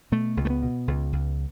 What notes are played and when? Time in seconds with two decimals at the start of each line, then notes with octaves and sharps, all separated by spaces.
0.12 B2 A3
0.37 C#2
0.45 A3
0.50 B3
0.63 B2
0.88 C#2
1.13 C#2